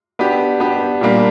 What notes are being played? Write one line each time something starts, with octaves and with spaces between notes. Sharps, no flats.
B3 D4 G4
B3 D4 G4
A#2 G3 A#3 D4 F4